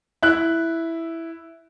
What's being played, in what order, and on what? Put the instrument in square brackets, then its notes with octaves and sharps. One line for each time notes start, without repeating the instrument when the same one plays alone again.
[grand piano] E4 F#6